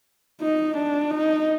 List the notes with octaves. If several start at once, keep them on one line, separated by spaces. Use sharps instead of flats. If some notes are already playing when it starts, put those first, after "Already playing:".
D#4
D4
D#4